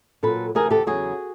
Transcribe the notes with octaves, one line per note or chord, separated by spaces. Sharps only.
A#2 F#3 A4 B4
D2 C3 E3 G#4 A#4
G4 A4
E2 C#3 F#3 F#4 G#4